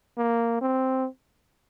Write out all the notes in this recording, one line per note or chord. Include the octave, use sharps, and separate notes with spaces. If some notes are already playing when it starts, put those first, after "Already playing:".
A#3
C4